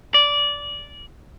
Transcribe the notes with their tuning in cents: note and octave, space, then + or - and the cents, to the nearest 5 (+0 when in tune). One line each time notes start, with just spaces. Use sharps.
D5 -15